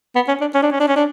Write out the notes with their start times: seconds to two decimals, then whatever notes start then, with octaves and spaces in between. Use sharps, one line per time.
0.15 B3
0.28 C#4
0.41 D4
0.54 C#4
0.63 D4
0.71 C#4
0.80 D4
0.88 C#4
0.96 D4